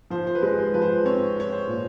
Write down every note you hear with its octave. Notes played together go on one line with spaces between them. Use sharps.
F3 C5
C5
B4
G#3
C5
F3 B4
C5
C4 C#5
C4 C#5
C5
A#2